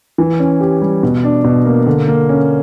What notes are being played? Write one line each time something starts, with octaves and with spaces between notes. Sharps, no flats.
E3
C#4
G4
G3
B2
D4
B2
A#3
D3
A#3
C#4